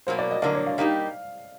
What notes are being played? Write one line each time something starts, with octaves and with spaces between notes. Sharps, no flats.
B2 F#3 A#3 C5
D5
D#5
D3 F#3 A#3 D5
C#5
F5
G3 A#3 D#4 G4 F5